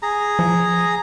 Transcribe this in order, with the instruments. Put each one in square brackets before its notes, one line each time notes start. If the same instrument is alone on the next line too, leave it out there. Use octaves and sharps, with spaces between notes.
[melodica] G#4 A#5
[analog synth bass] F3